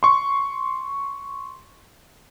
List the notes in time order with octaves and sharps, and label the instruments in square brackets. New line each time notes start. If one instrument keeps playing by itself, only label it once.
[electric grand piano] C6 C#6